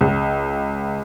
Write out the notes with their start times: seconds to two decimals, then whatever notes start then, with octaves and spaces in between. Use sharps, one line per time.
0.01 C#2